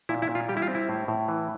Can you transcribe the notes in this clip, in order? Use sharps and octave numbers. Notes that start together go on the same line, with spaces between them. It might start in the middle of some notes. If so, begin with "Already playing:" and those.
A#2 E4
E4
A#2
F4
G3 G4
E4
F4
C4
E4
A2
A2
E3